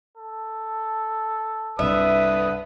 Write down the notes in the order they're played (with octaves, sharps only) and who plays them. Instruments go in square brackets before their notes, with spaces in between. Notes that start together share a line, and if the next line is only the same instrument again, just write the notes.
[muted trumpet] A4
[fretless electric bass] C2 G2 [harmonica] D3 B4 D#6 [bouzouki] E5